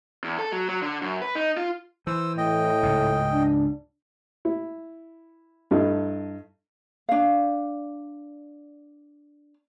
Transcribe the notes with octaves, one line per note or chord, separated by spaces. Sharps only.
E2
A4
F#3
F#3
D3
F#2
B4
D#4
F4
E3 C5 E6
A2 D#5 G5
C#2 G#2
D4
E4
G2 A3 D#4 E4
D4 F5